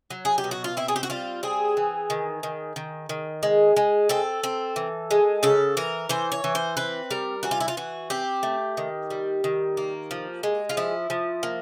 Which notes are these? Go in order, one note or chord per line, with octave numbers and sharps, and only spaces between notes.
F#3
G#4
G4
B2
F#4
F4
C4 E4
G#4
G4
F#4
G3 F4
C4 G#4
E3
D#3
D#3
D#3
D#3
G#3
G#3
C4 A4
C4
E3
G#3
C#3 A4
E3 A#4
E3 C5
C#5
E3
C5
C4 B4
G3 A#4
E3 F#4
F4
E4
F4
E3 F#4
C4 G4
A3
D#3
G3
D#3
A#3
F3
G#3
F4
F3 E4
F3
A#3